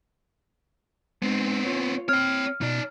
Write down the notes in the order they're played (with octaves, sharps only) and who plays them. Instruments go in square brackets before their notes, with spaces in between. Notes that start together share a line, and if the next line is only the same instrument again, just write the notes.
[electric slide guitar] G#3 D#4 [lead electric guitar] B3 C4
[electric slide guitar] F4 C#5
[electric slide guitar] C4 [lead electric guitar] C#5 G5 [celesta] F6
[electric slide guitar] B2 [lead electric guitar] D#4 D5